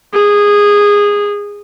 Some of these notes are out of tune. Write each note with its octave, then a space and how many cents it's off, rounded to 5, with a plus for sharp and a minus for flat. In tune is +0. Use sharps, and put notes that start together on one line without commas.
G#4 -15